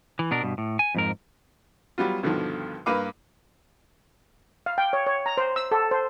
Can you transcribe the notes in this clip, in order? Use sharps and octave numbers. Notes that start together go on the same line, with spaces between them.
E3
B2 D4 A#4
G2 B2
A2
G#5
F2 G#2 A#4
F#3 G3 B3 F4
G2 B2 D3 D#3 F3
G2 A#3 B4 F5 D6
F5
G5
C#5
C#5
A#5
C5
E6
A4
C5